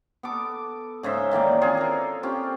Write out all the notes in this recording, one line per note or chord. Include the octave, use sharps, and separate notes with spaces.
B3 A4 D6
G#2 C#3 C5 E5
D#3 E3 A#3 D5
C4 F4 G#4
A4 A#4
C4 C#4 F4 G4